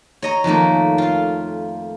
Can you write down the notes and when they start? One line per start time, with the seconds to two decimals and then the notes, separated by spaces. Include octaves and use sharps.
0.22 C#5 D#5 A#5
0.44 F2 D#3 A3 A#3
0.98 F4 F5